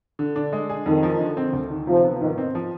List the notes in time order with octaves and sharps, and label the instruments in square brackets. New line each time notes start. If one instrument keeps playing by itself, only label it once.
[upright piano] D3
D4
G#3
G#4
[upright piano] F2 [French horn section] D#3
[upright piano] F3
D3
C4
D2
D#3
[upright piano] C3 [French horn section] F3
[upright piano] B3
[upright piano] G#2 [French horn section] D#3
[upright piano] C4
F3